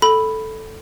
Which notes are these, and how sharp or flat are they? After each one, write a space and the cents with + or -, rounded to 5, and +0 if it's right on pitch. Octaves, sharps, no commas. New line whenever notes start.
A4 +0 B5 +0